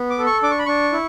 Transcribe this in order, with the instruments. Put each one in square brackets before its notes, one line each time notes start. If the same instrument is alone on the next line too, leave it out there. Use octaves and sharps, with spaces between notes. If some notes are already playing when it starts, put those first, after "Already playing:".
Already playing: [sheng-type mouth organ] B3
D6
A4
C#6
D4 D6
C#6
B5
D4 C#6
E4